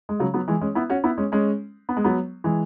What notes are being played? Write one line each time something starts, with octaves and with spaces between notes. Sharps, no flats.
G#3
C#3 F#3
F#3 B3
E3 G#3
G#3 C#4
B3 E4
C#4 F#4
B3 E4
G#3 C#4
G#3 C#4
B3
G#3
F#3 B3
E3 G#3